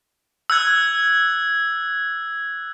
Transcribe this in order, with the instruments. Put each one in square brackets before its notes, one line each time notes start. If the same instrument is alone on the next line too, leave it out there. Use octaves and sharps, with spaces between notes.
[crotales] E6 F#6 G#6